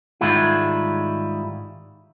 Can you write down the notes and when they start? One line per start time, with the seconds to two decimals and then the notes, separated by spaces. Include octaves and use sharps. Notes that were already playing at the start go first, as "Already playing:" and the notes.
0.21 G#2 D#3 G3 G#3 E4 F4